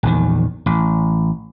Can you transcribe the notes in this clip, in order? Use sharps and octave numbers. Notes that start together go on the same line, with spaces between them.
A#1 E2 D#3
A1